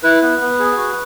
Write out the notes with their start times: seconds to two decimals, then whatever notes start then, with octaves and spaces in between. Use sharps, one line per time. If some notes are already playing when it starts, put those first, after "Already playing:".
0.03 E4 B4
0.22 B3
0.41 B3
0.59 G#4
0.77 F#4